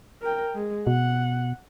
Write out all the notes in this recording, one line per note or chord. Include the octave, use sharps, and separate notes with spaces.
A#4 G5
G#3
B2 F#5